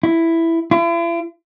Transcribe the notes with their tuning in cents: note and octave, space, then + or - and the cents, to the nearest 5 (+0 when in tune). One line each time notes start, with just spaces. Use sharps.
E4 +5
E4 +45